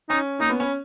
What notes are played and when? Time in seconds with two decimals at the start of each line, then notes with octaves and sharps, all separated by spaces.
0.09 C#4 D#4
0.40 A#3 D#4
0.50 B3
0.60 C#4